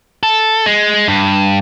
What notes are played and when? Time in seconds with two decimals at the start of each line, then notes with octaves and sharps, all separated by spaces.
0.23 A4
0.66 G#3
1.08 G2